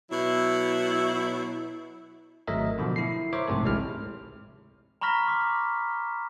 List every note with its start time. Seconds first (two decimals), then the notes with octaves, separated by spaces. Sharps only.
0.11 B2 F#3 E4
2.47 G#1 F#3 A3 A#4 D#5 E5
2.78 B2 D3 F3
2.96 E4 C7
3.33 A#4 C5 C#5 E5 D6
3.48 A#1 G#2 C3 A3 A4
3.63 G#1 C#2 C3 G#3 E4 F6
5.01 A#5 B5 C#6 F6 A#6 B6
5.27 C6 D6 B6